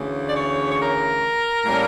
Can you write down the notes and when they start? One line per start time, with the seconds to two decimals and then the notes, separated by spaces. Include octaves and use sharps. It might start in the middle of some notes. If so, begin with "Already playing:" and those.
Already playing: D2 C#3 E3
0.28 D5
0.35 C#5
0.70 C#5
0.79 A#4
1.65 A2 G3 A#3 C#4